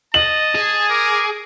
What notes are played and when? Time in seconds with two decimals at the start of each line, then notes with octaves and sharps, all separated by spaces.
0.14 D#5 A5 F#7
0.55 G#4
0.90 A#4 D6